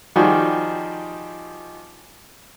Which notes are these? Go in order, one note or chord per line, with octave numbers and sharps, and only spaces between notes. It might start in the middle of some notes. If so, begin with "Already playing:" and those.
D#3 F3 G3 F#4 G#4